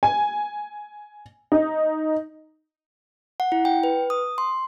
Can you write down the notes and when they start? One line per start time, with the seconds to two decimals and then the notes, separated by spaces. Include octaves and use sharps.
0.03 G#5
1.52 D#4
3.40 F#5
3.52 E4
3.65 G5
3.84 B4
4.10 D#6
4.38 C6